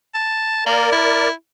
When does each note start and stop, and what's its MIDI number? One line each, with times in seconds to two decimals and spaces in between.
0.15 0.62 81
0.66 0.89 58
0.66 1.29 70
0.66 1.29 74
0.92 1.32 64